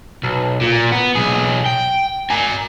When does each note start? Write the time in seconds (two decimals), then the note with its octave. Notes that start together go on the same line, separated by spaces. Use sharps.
0.23 B1
0.61 A#2
0.92 B3
1.15 B1 G#4
1.66 G5
2.30 A#4 G#5